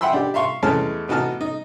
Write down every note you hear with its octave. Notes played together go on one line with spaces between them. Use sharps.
E5 F#5 G5 B5 C6 E6
D4 G4
E5 F5 C6 C#6
E2 G#3 A3 C#4 A5 F6
A1 B3 D#4 F#4 A5 F6
D#4